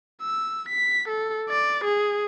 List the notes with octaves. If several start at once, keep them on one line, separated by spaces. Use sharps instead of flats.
E6
B6
A4
D5
G#4